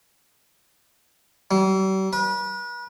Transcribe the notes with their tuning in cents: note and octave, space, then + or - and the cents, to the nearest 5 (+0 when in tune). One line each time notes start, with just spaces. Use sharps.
G3 -45
B4 -40